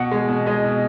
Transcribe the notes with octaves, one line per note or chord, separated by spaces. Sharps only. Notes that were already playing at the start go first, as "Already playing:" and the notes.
Already playing: B2 F#5
G#3
B2
G#3 D#5
B2